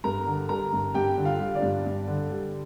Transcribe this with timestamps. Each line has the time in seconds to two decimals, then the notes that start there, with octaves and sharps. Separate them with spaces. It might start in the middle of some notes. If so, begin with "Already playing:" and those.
0.04 G2 A#4 A#5
0.26 D3
0.49 G3 A#4 A#5
0.73 G2
0.94 G2 G4 G5
1.18 D3
1.25 F4 F5
1.39 G3
1.55 D4 D5
1.62 G2
1.86 G2
2.07 D3
2.30 G3